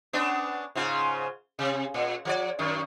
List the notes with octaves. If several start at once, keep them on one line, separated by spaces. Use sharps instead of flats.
B3 C#4 D4
G#2 C#3 F4
C3
A#2
F3 A#4 D5
F#2 D#3